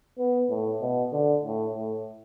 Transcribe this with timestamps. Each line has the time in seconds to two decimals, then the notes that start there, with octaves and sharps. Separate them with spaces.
0.18 B3
0.50 A2
0.81 B2
1.12 D3
1.43 A2
1.74 A2